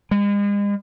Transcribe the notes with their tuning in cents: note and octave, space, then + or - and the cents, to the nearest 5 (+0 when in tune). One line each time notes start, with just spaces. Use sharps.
G#3 -40